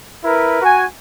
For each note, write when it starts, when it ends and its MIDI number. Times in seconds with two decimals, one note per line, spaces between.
0.24 0.62 64
0.24 0.62 70
0.24 0.62 71
0.63 0.84 66
0.63 0.84 80